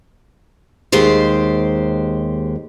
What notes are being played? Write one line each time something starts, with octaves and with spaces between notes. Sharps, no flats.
D#2 G#3 G4 C5